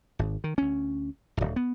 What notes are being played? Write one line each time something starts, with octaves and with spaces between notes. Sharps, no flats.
G#1
D#3
D2 C#4
D1 A#1
B3